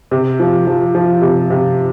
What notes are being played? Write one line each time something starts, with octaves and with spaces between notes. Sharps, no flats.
C3
F3
F3
F3
C3
C3